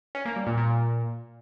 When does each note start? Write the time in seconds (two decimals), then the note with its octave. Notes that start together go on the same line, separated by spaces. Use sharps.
0.15 C#4
0.25 A#3
0.36 G3
0.47 A#2
0.57 A#2